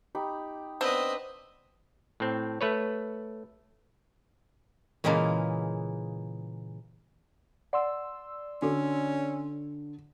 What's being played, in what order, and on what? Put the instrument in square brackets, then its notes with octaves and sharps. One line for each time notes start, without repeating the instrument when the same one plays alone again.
[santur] D#4 G4 B5
[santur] B3 D4 [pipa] C4 [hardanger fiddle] B4 D#5
[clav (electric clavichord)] A2 C4
A3 B4 C#5
[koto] A#2 C#3 E3 G#3 A#3
[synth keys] D5 C6 E6 [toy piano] F#5
[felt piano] D3 [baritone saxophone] C#4 [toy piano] F#4 A4